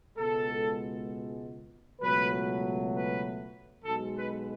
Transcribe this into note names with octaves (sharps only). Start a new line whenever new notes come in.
C#2 B2 G#3 B3 A4
C#2 B2 F#3 A3 B4
B4
B1 B2 G#3 A4
B4